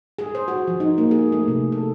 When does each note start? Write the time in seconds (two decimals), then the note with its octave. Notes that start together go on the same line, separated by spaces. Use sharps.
0.18 G#4
0.35 C5
0.48 F#4
0.67 F3
0.80 D#4
0.98 A#3
1.11 G#4
1.32 A3
1.48 C3
1.72 A4